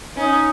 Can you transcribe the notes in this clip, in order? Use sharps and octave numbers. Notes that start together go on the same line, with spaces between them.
C#4 D#4